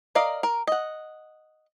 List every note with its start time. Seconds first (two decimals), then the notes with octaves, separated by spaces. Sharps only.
0.15 A#4 D5 D#5 F5
0.43 A#4
0.67 D#5 F#5